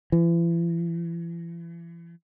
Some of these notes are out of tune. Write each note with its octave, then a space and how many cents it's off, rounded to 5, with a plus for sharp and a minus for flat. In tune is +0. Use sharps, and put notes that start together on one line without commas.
E3 +40